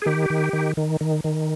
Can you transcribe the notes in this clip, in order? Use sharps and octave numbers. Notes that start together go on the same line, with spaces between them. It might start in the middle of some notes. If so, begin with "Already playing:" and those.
G#4
D#3 G4
D#3
D#3
D#3
D#3
D#3